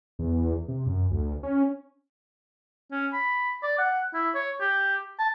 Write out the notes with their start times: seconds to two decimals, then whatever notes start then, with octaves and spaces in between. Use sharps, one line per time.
0.19 E2
0.68 C3
0.86 F#2
1.11 D2
1.43 C#4
2.91 C#4
3.13 B5
3.63 D5
3.78 F#5
4.14 E4
4.35 C#5
4.61 G4
5.19 A5